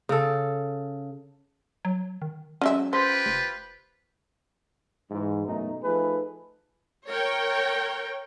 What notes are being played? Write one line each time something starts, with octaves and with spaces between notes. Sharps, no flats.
C#3 A4
F#3
D#3
F#3 G#3 C#4 E5
F4 G4 B4 C5
F1
G#2 E3
A1 F#2 B2 A3 D#4
F3 A3 D#4 G#4 A4 B4
A#4 C#5 G5